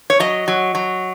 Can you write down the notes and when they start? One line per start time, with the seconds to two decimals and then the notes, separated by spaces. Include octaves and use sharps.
0.10 C#5
0.20 F#3 D#5
0.48 F#3
0.75 F#3